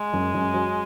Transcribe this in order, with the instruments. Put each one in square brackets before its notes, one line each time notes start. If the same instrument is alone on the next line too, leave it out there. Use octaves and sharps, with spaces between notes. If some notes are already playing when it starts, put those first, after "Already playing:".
Already playing: [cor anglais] G#3
[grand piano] F#2
F#2
F#3